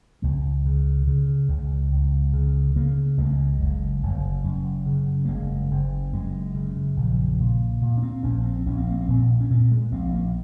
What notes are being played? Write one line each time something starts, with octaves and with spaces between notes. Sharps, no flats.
C#2 G#3
C#3
C#3
C#2
C#2
C#3
C#3 A#3
C#2 G#3
A#3
G#3
F#1
F#1
F#2
C#3
A#3
F#1 G#3
F#1
F#2 G#3
C#3
A#1
A#2
A#2
C#4
C4
A#1 C#4
C4
A#1 C#4
C4
A#3
C4
A#2
C#4
A#2 C4
G#3
A#1 C4
A#3